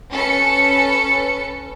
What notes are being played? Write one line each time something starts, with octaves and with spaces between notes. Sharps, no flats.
C#4 A4 B4 C#7